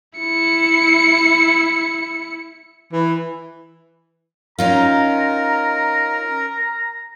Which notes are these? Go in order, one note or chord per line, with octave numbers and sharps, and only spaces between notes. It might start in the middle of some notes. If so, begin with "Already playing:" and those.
E4 C#7
E3
C#4 D#4 F4 A#4 A#5